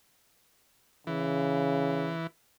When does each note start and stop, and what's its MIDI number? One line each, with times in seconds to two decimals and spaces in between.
1.07 2.14 49
1.07 2.27 52